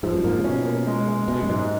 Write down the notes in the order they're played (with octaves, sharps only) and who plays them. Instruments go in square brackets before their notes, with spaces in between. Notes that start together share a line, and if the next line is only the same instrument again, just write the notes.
[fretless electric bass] G#2 [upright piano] F3
[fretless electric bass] F#2
[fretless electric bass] G#2 [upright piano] A#3
[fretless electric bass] C#3
[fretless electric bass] B2 [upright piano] C#4
[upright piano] A#3
G#3
G#3
[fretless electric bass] B2 [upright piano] G#3
[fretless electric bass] F#2
[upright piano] G#2